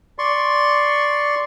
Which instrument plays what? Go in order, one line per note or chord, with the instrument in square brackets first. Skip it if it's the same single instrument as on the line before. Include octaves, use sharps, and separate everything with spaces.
[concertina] D5 C6 C#6